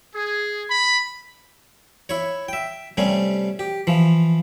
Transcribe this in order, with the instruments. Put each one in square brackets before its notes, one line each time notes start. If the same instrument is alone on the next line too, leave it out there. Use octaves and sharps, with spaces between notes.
[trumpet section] G#4
B5
[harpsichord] E4 C#5
E5 G5
C3 G3 A3 C#4
G4
E3 F3